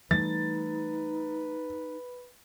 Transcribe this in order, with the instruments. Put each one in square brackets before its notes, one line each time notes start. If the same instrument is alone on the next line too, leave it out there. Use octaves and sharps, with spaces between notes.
[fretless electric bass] E3 G3 A3 [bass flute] D#4 [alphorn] B4 [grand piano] A6